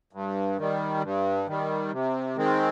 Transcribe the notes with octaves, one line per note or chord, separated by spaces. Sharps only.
G2
D#3 G3
G2
D#3 G3
C3
D#3 G#3 C4